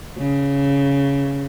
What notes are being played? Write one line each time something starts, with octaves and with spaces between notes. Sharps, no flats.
C#3